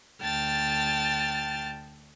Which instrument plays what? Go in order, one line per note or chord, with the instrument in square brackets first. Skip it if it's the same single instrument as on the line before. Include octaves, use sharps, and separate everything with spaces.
[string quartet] D2 G5 A5 F6 A6